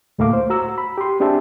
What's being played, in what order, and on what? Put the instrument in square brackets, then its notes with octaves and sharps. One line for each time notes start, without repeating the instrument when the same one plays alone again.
[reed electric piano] D2 A2 A3 A#3 F5 D6
C5
F#4 A#5 E6
B5
G4 C6
C4 D4 G4 G#4 E5 A5